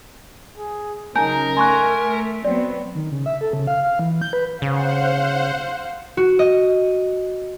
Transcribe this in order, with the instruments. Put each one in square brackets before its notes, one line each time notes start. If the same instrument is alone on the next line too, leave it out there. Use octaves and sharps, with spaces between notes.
[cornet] G#4
[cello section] C#3 F#3 [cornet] D#4 [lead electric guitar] A#4 [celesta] G#5 A5 G6
[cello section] A3 [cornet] G#5 [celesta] C6 C#6 F#6
[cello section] F#3 B3 [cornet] C4 [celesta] D5
[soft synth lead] D#3
C#3
E5
A4
C#3
F5
F5
E3
G6
B4
[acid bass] C#3 [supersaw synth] C5 F#5 [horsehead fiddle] F5
[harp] F#4
D#5